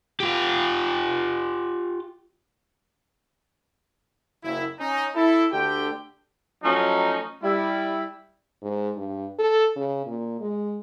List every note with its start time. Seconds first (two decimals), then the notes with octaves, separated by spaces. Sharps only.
0.20 F4 G4
4.44 F#1 E4
4.79 C#4 D#4
5.16 E4 A4
5.52 D2 D3 A3 G4 G5
6.63 F3 F#3 A3 C#4 D#4
7.42 G3 E4
8.62 G#2
8.97 G2
9.39 A4
9.76 C#3
10.06 A#2
10.41 G#3